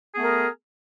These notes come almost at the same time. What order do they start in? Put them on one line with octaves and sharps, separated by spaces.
G#4 B3 A3 A#4